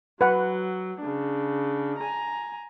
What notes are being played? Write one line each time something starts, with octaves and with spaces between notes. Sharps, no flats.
F#3 B4 F#5
C#3 D4
G#5 A#5